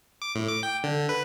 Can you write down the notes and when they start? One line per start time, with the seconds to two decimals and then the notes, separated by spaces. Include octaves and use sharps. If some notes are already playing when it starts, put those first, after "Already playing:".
0.22 D6
0.35 A2
0.48 D6
0.63 G5
0.84 D3
1.09 B4